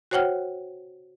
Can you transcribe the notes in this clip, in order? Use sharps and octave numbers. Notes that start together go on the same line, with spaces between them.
F#4 C5 C#5 F#5 G5 F6